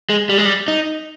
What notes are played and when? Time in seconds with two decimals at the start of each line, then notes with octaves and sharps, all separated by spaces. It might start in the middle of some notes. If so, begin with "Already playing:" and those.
0.10 G#3
0.29 G3
0.38 G#3
0.46 G3
0.68 D#4